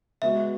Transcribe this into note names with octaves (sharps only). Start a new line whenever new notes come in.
G#3 B3 F#4 E5